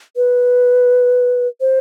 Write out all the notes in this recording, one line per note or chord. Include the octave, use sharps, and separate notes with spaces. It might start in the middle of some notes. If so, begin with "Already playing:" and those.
B4
C5